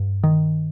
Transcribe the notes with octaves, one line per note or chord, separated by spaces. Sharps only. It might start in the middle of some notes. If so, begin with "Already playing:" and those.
Already playing: G2
D#3